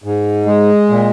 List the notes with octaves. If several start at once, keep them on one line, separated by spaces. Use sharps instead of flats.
G#2
G#3
A#2